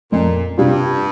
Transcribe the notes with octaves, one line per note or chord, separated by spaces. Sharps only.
F2 A#2
G2 C3 G3 D4 F4